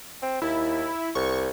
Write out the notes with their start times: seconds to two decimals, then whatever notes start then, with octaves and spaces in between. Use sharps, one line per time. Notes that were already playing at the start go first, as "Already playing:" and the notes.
0.22 C4
0.42 D#2 E4
1.15 C2 C#6